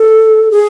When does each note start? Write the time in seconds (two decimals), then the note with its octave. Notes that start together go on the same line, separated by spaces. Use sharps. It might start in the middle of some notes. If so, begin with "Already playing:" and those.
Already playing: A4
0.51 G#4